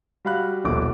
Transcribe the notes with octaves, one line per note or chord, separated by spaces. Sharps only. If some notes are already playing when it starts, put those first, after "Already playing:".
G3 F#4 F5 B5 F#6
D#1 A#1 B2 A4 D6